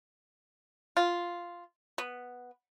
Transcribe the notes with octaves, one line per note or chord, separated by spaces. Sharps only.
F4
B3